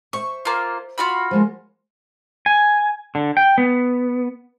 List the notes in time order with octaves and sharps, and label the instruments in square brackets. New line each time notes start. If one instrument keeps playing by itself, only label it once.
[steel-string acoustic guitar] C5 E5 [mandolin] C#6
[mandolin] A#3 F4
F4 F#4 B5
[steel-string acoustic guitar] F3 G#3 A#3
[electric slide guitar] G#5
D3
G5
B3